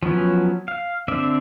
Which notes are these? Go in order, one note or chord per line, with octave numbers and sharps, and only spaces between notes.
F3 F#3 B3 C#4
F5
D3 C4 D5 E5